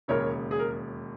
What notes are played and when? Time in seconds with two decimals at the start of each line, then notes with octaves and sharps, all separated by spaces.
0.08 E1 D#2 C#3 A#4 C#5
0.51 G#4
0.59 A#4